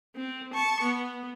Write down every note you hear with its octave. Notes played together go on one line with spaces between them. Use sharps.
C4
A5 C#6
B3